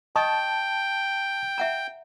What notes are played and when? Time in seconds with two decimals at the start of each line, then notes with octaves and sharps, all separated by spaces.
0.16 D#5 G5 A5 C#6 D#6
1.58 E5 F#5 A#5